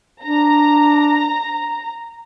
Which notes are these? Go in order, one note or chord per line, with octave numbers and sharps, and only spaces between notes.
D4 A#5